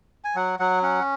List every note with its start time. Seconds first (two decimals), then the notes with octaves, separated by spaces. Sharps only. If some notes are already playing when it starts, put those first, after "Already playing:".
0.24 G#5
0.35 F#3 F#5
0.59 F#3 F#5
0.82 C#4 F#5